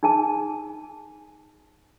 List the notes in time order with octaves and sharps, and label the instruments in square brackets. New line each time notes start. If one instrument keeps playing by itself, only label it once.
[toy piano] D#4 G#4 G#5 A5